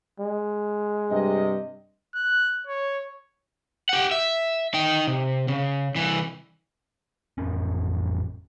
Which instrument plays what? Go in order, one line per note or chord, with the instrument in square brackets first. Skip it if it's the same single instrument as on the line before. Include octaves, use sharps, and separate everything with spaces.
[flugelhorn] G#3
[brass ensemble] G2 C3 D#5
[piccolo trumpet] F#6
C#5
[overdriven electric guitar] G4 F#5
E5
D#4 G5
C3
C#3
C2 E3
[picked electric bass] A1 F2 C#4